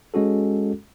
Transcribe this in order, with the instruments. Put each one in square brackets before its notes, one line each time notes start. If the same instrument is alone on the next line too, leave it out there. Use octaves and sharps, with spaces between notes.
[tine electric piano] G#3 C#4 F#4 A4